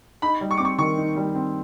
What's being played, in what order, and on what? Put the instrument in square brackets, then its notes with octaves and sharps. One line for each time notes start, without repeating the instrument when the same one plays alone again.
[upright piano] D#4 [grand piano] B5
[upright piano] G3
[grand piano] C#6
[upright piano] C4 [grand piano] D6
[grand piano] C#6
[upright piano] D#3 [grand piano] C#6
[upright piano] D#4
G3
C4